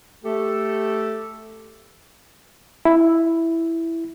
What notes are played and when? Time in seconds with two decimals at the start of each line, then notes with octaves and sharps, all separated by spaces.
0.24 A3 G4 A4
2.85 E4